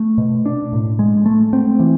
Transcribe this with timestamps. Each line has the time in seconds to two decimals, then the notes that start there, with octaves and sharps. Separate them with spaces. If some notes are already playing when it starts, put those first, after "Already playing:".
Already playing: A3
0.18 B2
0.46 D4
0.73 A2
0.99 G#3
1.26 A3
1.53 C4
1.80 E3